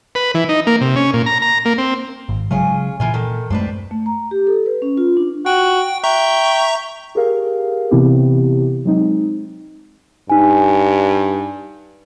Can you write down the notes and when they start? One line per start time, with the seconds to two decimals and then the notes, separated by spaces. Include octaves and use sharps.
0.15 B4
0.35 E3
0.49 D#4
0.67 A#3
0.81 C3
0.96 C#4
1.13 A#2
1.26 A#5
1.42 A#5
1.65 A#3
1.78 C4
2.29 G#1
2.51 C#3 F#3 G#3 C#4 F4 G#4
3.00 A#2 E3 E4 F4 G#5
3.14 D#3 A4
3.50 F#2 G#3 A3 C4 D4 B4
3.91 A3
4.06 A#5
4.31 G4
4.47 A4
4.66 B4
4.82 C#4
4.97 F4
5.17 D4
5.46 F#4 G5
6.04 E5 G5 A#5 C#6
7.15 G4 G#4 A#4 F5
7.91 C3 E3 B3 C4 E4 G4
8.85 F#3 G#3 C4 D#4
10.30 G2 D#4 G#5